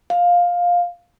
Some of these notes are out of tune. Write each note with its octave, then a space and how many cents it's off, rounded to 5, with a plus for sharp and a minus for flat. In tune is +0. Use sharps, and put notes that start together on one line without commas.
F5 +10